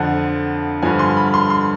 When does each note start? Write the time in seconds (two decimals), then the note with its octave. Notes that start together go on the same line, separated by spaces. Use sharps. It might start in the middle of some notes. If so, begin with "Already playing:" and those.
Already playing: F2 D3 F3 F#5
0.82 G2 D3 F3 G#5
0.99 C6
1.17 B5
1.34 C6
1.50 C6